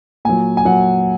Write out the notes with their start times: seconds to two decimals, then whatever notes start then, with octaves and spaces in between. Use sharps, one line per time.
0.25 A#2 F#3 G#5
0.57 G#5
0.65 A#2 F#3 F#5